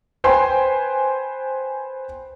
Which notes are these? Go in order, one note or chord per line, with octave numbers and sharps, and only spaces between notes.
B4 C5 G5 G#5 C6